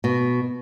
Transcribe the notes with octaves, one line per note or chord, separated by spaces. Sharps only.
B2